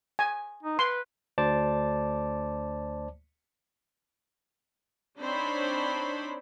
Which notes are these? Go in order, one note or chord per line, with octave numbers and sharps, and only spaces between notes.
G#5
D#4
B4 C6
D2 C5 D5 A5 D6
C4 D4 D#4 C5 C#5 B5